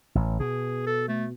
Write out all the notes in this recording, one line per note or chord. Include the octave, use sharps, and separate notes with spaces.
A1
B2 G#4
A4
A3